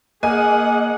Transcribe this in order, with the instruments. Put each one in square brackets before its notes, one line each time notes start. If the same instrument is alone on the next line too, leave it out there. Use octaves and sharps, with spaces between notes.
[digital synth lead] A#3 [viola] G#4 F#5 [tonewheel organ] D#5 [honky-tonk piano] G#5